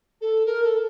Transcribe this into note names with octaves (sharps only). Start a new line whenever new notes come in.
A4
A#4
A4